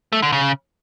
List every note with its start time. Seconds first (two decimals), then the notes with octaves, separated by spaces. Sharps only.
0.12 A3
0.22 D3
0.32 C#3